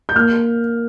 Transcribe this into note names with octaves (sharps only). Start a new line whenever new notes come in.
G6
A#3 F6